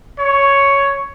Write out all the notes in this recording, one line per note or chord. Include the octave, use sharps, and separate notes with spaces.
C#5